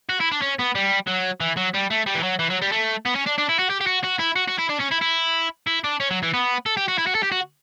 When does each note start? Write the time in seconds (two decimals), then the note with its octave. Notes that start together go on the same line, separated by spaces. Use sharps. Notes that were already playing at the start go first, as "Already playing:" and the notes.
0.09 F#4
0.20 E4
0.32 D4
0.42 C#4
0.59 B3
0.75 G3
1.07 F#3
1.41 E3
1.57 F#3
1.74 G3
1.90 A3
2.06 G3
2.15 E3
2.23 F#3
2.39 E3
2.50 F#3
2.62 G3
2.72 A3
3.05 B3
3.15 C#4
3.26 D4
3.38 D4
3.49 E4
3.59 F#4
3.70 G4
3.81 G4
3.87 F#4
4.04 F#4
4.19 E4
4.36 F#4
4.48 F#4
4.58 E4
4.69 D4
4.79 C#4
4.91 E4
5.01 E4
5.67 E4
5.84 D4
6.00 C#4
6.11 F#3
6.23 E3
6.34 B3
6.66 A4
6.77 G4
6.88 F#4
6.98 E4
7.07 F#4
7.15 A4
7.23 G4
7.32 F#4